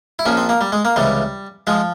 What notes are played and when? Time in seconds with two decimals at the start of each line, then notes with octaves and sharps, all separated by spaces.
0.19 E4
0.26 A#1 A#2 F3 C#4
0.37 C4
0.49 A#3
0.61 G3
0.72 G#3
0.85 A#3
0.96 C#2 C3 E3 G3
1.67 F3 G#3